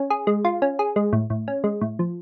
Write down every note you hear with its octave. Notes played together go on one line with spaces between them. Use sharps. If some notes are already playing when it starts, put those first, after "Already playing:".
Already playing: C#4
G#4
G#3
F4
C#4
G#4
G#3
A2
A2
C#4
G#3
A2
F3